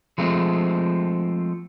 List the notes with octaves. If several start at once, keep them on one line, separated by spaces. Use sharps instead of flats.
F3 G#3 A3 C4